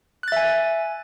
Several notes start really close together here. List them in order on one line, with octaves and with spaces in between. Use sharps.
F#6 A6 E5 G#5